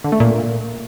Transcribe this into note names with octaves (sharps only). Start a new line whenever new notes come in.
D3
A3
A#2